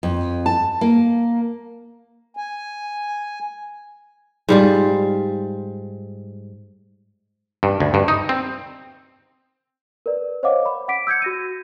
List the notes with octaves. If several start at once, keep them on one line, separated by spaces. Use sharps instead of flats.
F2
A5
A#3
G#5
G#2 G3 F4
G2
D2
G2
D#4
C4
A#4 B4 D5
C5 C#5 D#5 F5 F#5 D6
B5
F#5 D6 B6 D7
E6 G6 G#6 C#7
F#4 A#6 D#7